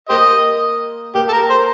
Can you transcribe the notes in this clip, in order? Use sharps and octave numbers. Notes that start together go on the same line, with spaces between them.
A#3 G4 C5 D#5
A#3 G4
A4
A#4
C5